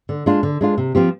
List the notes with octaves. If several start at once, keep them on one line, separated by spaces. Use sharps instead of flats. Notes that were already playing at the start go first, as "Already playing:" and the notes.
D3
G#3 D4 F4
D3
G#3 D4 F4
C3
F3 C4 G4